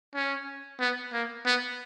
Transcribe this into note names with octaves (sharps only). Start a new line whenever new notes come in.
C#4
B3
A#3
B3